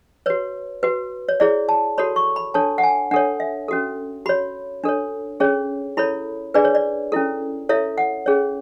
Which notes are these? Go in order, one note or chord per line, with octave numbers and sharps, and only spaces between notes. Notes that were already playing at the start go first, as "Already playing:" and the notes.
F#4 B4 C#5
F#4 B4
C#5
E4 G#4 C#5 D5
A5
F#4 A4 C#5 B5
C#6
B5
D4 A4 C#5 A5
F#5
G#5
D4 A4 C#5 F#5
E5
C#4 F#4 A4
F#4 C#5 B5
D4 A4 C#5
C#4 G#4 C#5
E4 A4 C#5 B5
D4 G#4 B4 D5
C#5
D5
C#4 E4 A4
E4 A4 C#5 E5
F#5
C#4 G#4 C#5